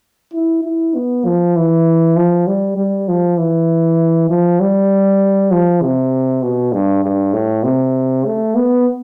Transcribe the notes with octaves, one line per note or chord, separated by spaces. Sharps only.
E4
E4
B3
F3
E3
F3
G3
G3
F3
E3
F3
G3
F3
C3
B2
G2
G2
A2
C3
A3
B3